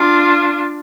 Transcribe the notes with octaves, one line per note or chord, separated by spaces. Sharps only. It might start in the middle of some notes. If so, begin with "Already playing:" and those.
Already playing: D4 F4